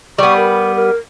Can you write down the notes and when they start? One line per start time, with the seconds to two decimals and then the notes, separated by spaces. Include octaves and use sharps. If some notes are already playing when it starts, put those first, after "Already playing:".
0.18 G3 B3 C#6
0.37 A#4
0.76 A#4